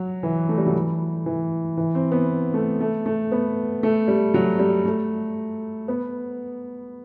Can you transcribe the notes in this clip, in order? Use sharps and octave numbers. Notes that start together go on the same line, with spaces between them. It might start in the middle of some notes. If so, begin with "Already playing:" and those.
Already playing: F#3
E3
A3
G3
F#3
E3
E3
E3
C4
B3
A3
A3
A3
B3
A3
G3
F#3
G3
A3
B3